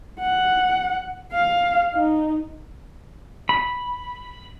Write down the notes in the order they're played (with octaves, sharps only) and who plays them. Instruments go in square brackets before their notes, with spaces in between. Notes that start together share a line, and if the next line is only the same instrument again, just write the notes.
[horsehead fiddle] F#5
F5
D#4
[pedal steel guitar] B5